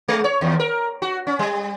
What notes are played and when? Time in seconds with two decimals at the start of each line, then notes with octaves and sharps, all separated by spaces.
0.08 G#3
0.24 C#5
0.41 D#2
0.60 A#4
1.02 F#4
1.27 C#4
1.39 G3